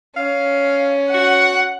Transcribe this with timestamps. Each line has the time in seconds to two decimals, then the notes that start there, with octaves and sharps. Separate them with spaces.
0.16 C#4 F5
1.14 F#4 F#5